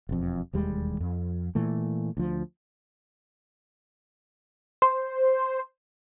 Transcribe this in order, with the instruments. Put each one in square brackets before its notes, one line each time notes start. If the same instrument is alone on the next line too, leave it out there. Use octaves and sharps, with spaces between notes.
[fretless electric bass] E1 F2
E1 D#2 G3 G#3
F2
A#2 E3 A3
D2 F3
[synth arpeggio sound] C5